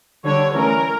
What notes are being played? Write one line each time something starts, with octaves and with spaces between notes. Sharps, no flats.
D3 G3 D4 C#5
E3 A3 C#4 A#4